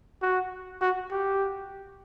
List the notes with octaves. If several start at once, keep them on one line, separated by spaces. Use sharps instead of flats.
F#4
F#4
G4